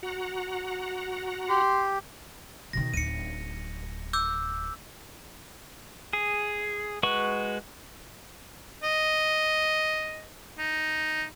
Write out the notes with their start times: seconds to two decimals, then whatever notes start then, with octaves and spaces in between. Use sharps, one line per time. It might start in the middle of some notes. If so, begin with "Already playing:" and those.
0.03 F#4 F#5 A#5
1.49 G4 C6
2.73 B2 D#3 A#6
2.94 D1 D#4 C#7 D#7
4.13 D6 E6 G6
6.13 G#4
7.03 G#3 F#4 B4 C#6
8.83 D#5
10.58 D#4